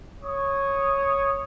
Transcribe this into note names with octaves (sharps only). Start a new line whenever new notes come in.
C#5 D#6